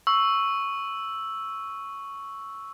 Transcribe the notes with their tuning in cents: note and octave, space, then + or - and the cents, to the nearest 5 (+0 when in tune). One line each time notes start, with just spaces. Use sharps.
C#6 +0 E6 +0